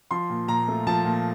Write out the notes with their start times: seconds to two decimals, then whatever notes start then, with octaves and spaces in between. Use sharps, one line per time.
0.11 F3 C6
0.30 A#2
0.48 A#2 A#5
0.68 A3
0.87 F3 A5
1.05 A#2